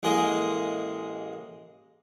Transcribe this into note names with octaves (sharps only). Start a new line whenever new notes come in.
A1 G#3 A#3 G#4 D#5